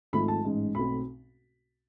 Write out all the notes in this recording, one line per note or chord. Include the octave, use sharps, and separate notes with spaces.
G#1 G#2 F3 A3 B5
A5
A1 G#2 G#3
B1 B2 A3 C4 B5